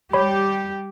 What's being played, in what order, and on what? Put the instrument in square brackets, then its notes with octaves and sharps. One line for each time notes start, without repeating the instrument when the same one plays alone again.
[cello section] G3 G4 [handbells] C#5 B5